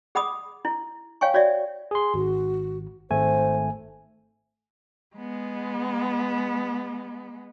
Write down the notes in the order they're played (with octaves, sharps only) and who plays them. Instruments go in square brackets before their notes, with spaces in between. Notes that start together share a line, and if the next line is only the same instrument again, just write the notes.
[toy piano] G#4 F#5 B5 D6 D#6
E4
C#5 F5 G5 G#5 C#6
F#4 C#5 D5 E5 F#5
[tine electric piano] G#4 C6
[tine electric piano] G#1 [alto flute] F#4
[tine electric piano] G#1 A3 G#5 [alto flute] C5
[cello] G#3 B3